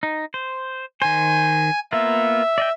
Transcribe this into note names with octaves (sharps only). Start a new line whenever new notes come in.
D#4
C5
D#3 C5 G#5
A#3 B3 F4 E5
D5 D#5 G5